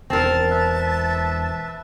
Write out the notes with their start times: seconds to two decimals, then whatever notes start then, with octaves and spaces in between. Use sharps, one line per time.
0.10 E1 C4 A#4 A5
0.50 B4 E5